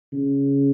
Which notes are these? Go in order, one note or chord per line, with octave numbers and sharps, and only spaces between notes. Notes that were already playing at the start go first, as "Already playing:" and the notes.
C#3